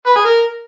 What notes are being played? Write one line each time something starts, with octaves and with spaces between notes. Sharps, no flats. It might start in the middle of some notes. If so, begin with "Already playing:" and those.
B4
G#4
A#4